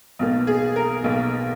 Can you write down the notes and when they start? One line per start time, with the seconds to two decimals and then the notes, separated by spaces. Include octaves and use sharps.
0.19 B1 B2 A#3
0.47 G#4
0.76 A#4
1.04 B1 B2 A#3